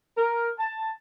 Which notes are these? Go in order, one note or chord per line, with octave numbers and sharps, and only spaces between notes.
A#4
A5